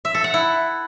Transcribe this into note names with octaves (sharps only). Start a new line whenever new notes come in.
E5
A4
F#5
E4